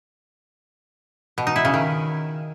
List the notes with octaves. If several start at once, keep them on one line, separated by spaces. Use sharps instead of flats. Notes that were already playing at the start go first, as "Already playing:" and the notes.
B2
D#4
E4
C#3
D#3